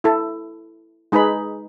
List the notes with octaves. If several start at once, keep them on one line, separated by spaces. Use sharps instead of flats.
E4 A4
G#3 D#4 G#4 B4 B5